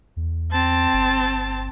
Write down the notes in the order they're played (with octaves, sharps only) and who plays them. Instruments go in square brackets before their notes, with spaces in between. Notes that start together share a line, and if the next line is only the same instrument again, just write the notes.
[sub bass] E2
[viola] C4 A5
[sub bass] G1